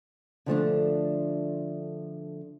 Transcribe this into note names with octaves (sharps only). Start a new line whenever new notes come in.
D3 F3 A3 D4